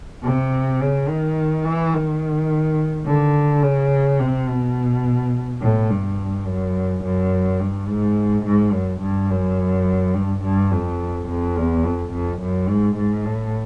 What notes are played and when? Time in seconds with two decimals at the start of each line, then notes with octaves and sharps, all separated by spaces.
0.23 C3
0.81 C#3
1.08 D#3
1.65 E3
1.94 D#3
3.06 D3
3.63 C#3
4.20 C3
4.49 B2
5.61 A2
5.90 G2
6.47 F#2
7.03 F#2
7.60 G2
7.88 G#2
8.45 G#2
8.73 F#2
9.00 G2
9.29 F#2
10.14 G2
10.42 G2
10.71 F2
11.28 F2
11.56 E2
11.84 F2
12.13 F2
12.40 F#2
12.69 G#2
12.97 G#2
13.25 A2